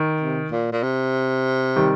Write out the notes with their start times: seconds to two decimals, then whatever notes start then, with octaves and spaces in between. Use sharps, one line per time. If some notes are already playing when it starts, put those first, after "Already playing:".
Already playing: D#3
0.20 C3
0.51 A#2
0.72 A#2
0.83 C3
1.76 D#3 G3